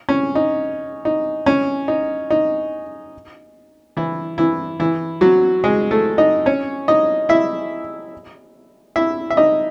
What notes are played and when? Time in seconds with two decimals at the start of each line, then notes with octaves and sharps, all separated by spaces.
0.09 C#4
0.35 D#4
1.05 D#4
1.46 C#4
1.88 D#4
2.30 D#4
3.97 E3 E4
4.38 E3 E4
4.80 E3 E4
5.21 F#3 F#4
5.64 G#3 G#4
5.91 A3 A4
6.18 D#4 D#5
6.46 C#4 C#5
6.88 D#4 D#5
7.29 E4 E5
8.96 E4 E5
9.30 E5
9.37 D#4 D#5